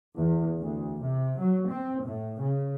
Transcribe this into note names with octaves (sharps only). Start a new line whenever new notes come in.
E2
D2
C3
F#3
C4
A2
C#3